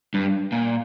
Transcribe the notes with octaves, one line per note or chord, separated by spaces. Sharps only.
G2
A#2